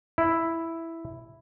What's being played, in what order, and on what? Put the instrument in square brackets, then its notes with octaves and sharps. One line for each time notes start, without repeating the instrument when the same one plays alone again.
[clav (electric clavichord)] E4